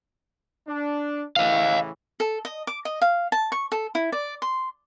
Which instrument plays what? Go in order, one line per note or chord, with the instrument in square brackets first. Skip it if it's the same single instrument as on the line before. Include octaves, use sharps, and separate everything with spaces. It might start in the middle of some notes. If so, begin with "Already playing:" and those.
[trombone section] D4
[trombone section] A2 C#3 E3 [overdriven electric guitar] D#5 F5
[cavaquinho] A4
D#5
D6
D#5
F5
A5
C#6
A4
E4
D5
C6